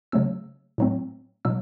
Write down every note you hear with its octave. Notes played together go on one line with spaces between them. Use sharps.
C#3 F#3 A3 C#4 E6
A2 F#3 A3 C4
B2 F#3 E6